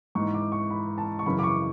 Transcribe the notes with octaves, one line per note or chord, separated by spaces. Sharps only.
G#2 E3 C#6
D6
C#6
B5
A5
C#6
F#2 C#3 E3 B5
D6
C#6